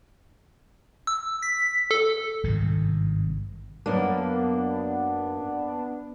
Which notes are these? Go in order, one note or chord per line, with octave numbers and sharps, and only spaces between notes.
E6
B6
A4
G#1 G2 C3 D#3
F#2 A#3 B3 D4